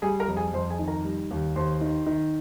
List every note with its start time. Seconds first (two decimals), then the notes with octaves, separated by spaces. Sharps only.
0.02 G3 G#4 G#5
0.20 A#4 A#5
0.28 F2
0.36 G#4 G#5
0.53 F2 C5 C6
0.70 G#4 G#5
0.79 D#3
0.88 A#4 A#5
1.04 G3
1.31 D#2
1.56 D#2 C5 C6
1.81 D#3
2.07 D#3